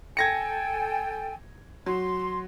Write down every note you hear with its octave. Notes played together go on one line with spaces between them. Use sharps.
A4 G5 G#5 G#6 A#6 C#7
F#3 C6